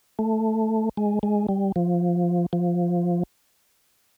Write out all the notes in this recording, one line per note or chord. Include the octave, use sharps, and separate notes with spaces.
A3
G#3
G#3
G3
F3
F3